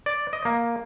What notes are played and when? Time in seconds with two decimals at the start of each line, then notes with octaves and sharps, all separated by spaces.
0.06 D5
0.33 D#5
0.45 A#3